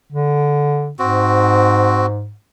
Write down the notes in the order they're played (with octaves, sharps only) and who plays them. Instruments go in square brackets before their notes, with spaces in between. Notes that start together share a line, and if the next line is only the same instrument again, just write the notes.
[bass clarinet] D3
[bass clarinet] G#2 [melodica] C4 F#4